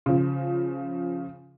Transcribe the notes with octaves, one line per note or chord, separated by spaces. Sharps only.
C#3 F3